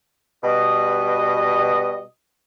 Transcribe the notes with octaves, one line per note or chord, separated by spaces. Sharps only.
B2 G3 D#5